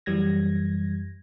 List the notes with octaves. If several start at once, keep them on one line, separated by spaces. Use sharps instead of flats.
F#2 E3 G3 G#6 A#6